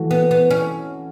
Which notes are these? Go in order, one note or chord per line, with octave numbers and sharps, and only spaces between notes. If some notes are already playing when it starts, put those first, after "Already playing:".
Already playing: E3 A3 F#4
B3
B3
C#4